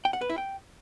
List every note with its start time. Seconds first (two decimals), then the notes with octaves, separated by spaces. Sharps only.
0.05 G5
0.13 F#5
0.21 B4
0.30 E4
0.38 G5